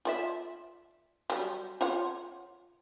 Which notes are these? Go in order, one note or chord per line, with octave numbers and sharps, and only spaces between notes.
F4 D5 E5
F#3 G3
F4 C#5 F#5